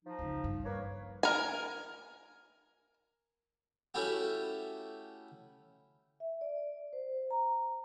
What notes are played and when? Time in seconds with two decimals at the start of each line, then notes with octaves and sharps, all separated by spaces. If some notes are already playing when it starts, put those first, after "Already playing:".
0.05 F3 D#4
0.19 F2 C#3
0.44 G2
0.64 A#3 B4 C#5
1.23 A#4 G#5
3.94 A3 C#4 E4 F#4 G4
6.20 E5
6.41 D5
6.93 C5
7.31 A#5